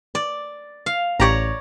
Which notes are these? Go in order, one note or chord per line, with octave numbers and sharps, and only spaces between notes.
D5
F5
A1 G4 C#5 D5 A#5